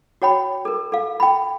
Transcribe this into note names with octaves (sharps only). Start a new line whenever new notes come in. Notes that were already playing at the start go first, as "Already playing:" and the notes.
F#4 C#5 G5 B5
A4 A#4
A4 F5
G5 B5